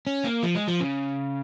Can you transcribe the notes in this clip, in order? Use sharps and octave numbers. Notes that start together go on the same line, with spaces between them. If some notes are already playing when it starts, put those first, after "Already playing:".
C#4
A#3
F3
G#3
F3
C#3